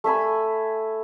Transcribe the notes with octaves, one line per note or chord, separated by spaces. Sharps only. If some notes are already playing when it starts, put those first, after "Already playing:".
A3 E5 G#5 B5